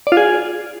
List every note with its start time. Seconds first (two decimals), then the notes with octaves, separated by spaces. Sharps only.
0.07 D5
0.12 F4
0.17 G#4